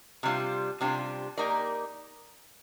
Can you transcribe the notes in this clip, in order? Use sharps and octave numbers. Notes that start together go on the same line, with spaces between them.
C3 G3 D4 F4
C3 G3 D4 F4
A#3 D#4 G4 A#4 D5